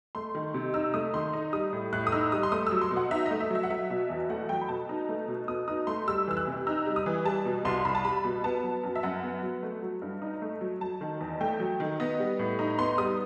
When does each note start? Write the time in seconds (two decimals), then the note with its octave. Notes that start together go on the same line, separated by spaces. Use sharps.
0.15 A3 C6
0.35 D#3
0.54 C3
0.74 D#4 E6
0.94 A3 D#6
1.13 D#3 C6
1.33 D#4
1.53 G3 D#6
1.73 A2
1.93 A2 F#6
2.07 D#6
2.12 D#4 E6
2.32 G3 D#6
2.43 C6
2.52 A3 D#6
2.67 F#3 E6
2.81 C6
2.91 B2
2.97 F#5
3.11 D#4 E5
3.26 D#5
3.31 A3
3.40 E5
3.50 F#3
3.55 E5
3.63 F#5
3.71 F#3 E5
3.90 B2
4.10 E2
4.29 A3 F#5
4.49 F#3 G5
4.61 B5
4.69 B2 A5
4.89 D#4
5.09 A3
5.28 B2
5.48 B2 D#6
5.68 D#4 D#6
5.87 A3 C6
6.08 G3 E6
6.28 E3 E6
6.37 F#6
6.47 C3
6.67 D#4 E6
6.86 G3
6.96 D#6
7.06 E3
7.25 G3 A5
7.45 B2
7.65 C2 C6
7.85 C2 B5
7.95 A5
8.05 G3 B5
8.25 B2
8.44 B3 A5
8.64 F#3
8.84 F#2
8.96 E5
9.03 F#2 F#5
9.23 B3
9.43 F#3
9.63 A3
9.82 F#3
10.02 G2
10.22 D#4
10.42 A3
10.61 F#3
10.81 F#3 A5
11.01 D#3
11.21 E2
11.41 A3 G5
11.60 F#3
11.80 D#3
12.00 B3 D#5
12.19 G3
12.39 A2
12.59 D#4
12.78 B3 C6
12.98 G3 D#6